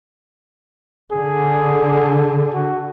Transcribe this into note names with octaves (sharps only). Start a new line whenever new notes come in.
D3 G#4
F#4